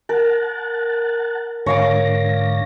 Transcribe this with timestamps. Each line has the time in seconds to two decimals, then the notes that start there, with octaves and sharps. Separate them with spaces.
0.09 A#4 F#5 A5
1.66 G#2 D3 C#5 F5 D6 A#6